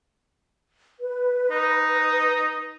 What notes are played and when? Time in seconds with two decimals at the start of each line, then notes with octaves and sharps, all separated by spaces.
1.00 B4
1.51 D#4